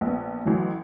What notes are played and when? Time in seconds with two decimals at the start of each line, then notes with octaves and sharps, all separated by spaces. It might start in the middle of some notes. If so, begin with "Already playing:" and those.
0.01 A#1 B3
0.45 A1 E3 F#3